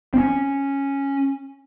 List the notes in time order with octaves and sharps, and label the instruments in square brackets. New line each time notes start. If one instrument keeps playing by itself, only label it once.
[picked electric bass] C4 C#4